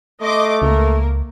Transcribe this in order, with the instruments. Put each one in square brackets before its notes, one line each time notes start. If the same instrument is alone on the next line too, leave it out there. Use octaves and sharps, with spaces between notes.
[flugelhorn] A3 [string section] D#5 C6 D6
[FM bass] C#2 [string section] A#3 A#4